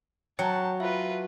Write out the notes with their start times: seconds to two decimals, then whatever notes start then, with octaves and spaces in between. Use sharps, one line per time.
0.39 F#3 C#5 G5 A5 C#7
0.80 F4 B4 E5